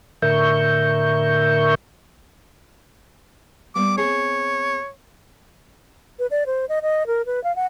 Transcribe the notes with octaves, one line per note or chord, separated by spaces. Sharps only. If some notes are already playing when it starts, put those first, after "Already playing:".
A2 D3 A#4 E5 C#6 G6
G3 A#3 B3 D6
B3 C4 G#4 C#5
B4
D5
C5
D#5
D#5
A#4
B4
F5
F#5